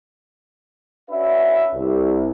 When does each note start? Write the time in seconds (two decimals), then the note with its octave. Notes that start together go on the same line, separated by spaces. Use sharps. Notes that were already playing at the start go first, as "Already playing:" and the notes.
1.11 C#4 D4 F#4 B4 E5
1.75 C2